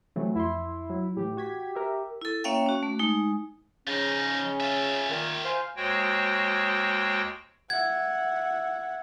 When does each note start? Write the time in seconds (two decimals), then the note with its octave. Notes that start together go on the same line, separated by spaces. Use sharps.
0.16 C3 E3 F#3 A3
0.35 F2 E4 C6
0.90 F#3
1.17 A2 E3 G4
1.37 F#4 G#6 B6
1.75 A#4 E5
2.22 E4 A4
2.44 A#3 C#4 C#5 E5 F5 G5
2.66 C#4 F#4
2.83 A3
2.99 G#3 D#4
3.87 C#3 F3 C#4 D#4
4.60 F4 E5
5.10 A#2 D#3
5.45 C5 F5 G#5
5.76 D#2 G#3 F#4 C5 C#5 G5
7.70 E5 F#5 G#6